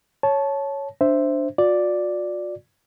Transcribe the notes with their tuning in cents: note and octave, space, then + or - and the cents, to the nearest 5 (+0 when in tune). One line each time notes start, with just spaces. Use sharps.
C#5 +0 A5 -15
D4 +0 C5 +0 E5 +0
F#4 -45 D5 +0